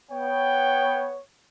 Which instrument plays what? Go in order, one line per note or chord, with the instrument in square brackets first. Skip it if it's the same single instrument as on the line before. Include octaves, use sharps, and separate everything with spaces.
[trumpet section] B3 C#5 [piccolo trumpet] G5